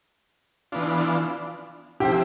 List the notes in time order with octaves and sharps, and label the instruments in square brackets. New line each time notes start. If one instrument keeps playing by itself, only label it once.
[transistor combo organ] E3 B3 D4 F4
[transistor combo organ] F3 C4 E4 [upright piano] G4